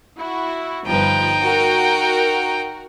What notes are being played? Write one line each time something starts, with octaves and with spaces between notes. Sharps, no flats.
E4 F#4
G1 F3 D#4 B4 G5
F#4 A#4